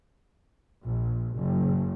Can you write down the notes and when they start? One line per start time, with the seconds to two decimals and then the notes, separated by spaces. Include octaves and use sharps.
0.83 A#1
1.34 F#1